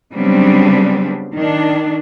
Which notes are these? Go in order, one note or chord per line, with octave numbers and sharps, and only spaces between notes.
C#3 F#3 G3 B3 C4 D4
D#3 D4